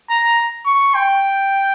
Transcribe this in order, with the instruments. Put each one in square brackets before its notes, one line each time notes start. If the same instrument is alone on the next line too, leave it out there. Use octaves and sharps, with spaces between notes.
[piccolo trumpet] A#5
C#6
G5